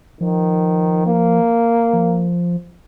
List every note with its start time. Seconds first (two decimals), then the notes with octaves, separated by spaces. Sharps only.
0.20 D#3 F3
1.06 A#3
1.93 F3